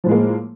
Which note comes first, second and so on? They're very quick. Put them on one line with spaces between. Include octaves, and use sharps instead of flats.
F3 A2 G#3 A#3